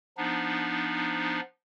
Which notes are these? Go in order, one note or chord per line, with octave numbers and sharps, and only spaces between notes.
F3 B3 D4 D#4